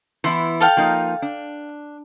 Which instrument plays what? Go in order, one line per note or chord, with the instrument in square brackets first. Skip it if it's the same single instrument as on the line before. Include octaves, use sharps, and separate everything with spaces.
[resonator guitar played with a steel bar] E3 B3 E4 [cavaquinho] C6
[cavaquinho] A4 F5 G5
[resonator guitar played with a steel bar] F3 A#3 D#4
D4